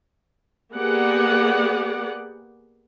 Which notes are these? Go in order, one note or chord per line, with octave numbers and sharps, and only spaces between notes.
A#3 B3 G4 G#4 D5 F#5